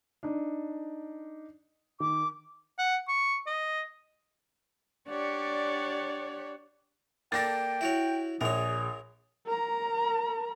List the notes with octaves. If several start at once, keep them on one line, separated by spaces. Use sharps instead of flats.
D4 D#4
D#3 D6
F#5
C#6
D#5
D4 G4 C#5 D5 F#5
A#3 D4 A4 G5 A6 A#6
E4 F#4 C#5
A#1 G#4 A#4 C#5
A#4 A#5